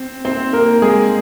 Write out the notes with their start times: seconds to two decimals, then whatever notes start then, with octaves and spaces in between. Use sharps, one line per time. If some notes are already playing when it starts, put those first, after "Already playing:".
Already playing: C4
0.25 C4 C5
0.53 A#3 A#4
0.82 G#3 G#4